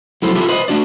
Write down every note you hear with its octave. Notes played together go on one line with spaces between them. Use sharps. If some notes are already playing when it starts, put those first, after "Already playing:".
F#3 E4 A4 C5
B3 E4 F4 G4 A4
B4 C5 D#5 B5
A3 D4 F#4 D5